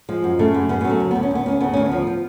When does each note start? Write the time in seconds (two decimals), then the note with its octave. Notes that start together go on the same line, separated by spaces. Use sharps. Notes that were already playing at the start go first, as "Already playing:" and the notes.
0.09 F3 G#3
0.24 F#2
0.39 C#3 A3
0.54 F#2
0.69 C#3 B3
0.81 F#3 B3
0.90 A3
1.00 D2
1.11 D2 B3
1.23 C#4
1.31 D2 B3
1.46 D2 C#4
1.61 C#3 B3
1.73 D2 C#4
1.86 B3
1.92 F3
2.07 F3